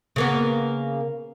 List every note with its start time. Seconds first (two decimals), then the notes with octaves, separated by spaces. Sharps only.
0.16 C#3 A#3 B3